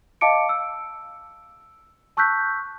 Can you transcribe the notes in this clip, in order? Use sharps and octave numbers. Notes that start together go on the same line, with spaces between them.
D#5 F5 A5 D6 C#7 D7
E6
A5 C#6 E6 F#6 G6 B6